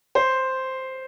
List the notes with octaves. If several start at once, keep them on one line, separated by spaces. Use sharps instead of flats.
C5